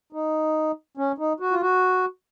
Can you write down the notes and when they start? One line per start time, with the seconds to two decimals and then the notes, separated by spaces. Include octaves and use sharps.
0.13 D#4
0.97 C#4
1.18 D#4
1.40 F#4
1.51 F4
1.61 F#4